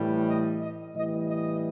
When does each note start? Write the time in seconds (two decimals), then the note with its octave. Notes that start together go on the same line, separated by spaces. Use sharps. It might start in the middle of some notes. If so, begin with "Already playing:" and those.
Already playing: A2 E3 G3
0.28 D#5
0.61 D#5
0.94 A2 E3 G3 D#5
1.27 D#5